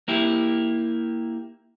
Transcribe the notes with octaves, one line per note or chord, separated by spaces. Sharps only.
A#3 E4 G4